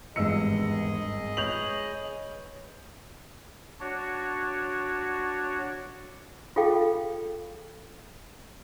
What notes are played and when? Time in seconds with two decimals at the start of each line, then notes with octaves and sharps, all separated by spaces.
0.16 G#1 E2 G2 G#4 D#5 E6 C#7
1.37 B4 C#5 G6 F7 F#7
3.80 D4 F#4 C#5
6.56 F4 G#4 A4 F5 G5